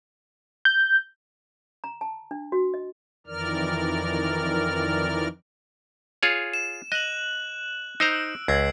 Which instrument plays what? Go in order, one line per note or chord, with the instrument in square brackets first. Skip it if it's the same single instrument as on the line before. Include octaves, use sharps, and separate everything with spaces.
[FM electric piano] G6
[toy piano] A#5
A5
D4
F#4
D#5
[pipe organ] F2 D#3 E3 A#4 D5 F6
[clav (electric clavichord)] F4 G#4 C#5
[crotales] E7
[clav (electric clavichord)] D#5 [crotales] F#6 F#7
[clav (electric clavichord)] D#4 C5 A#5 [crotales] E6 D7
[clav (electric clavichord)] C#2 [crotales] E6 G#6 C7